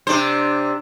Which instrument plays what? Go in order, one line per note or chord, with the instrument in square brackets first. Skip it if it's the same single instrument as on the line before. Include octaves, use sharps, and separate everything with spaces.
[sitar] C3 D4 C5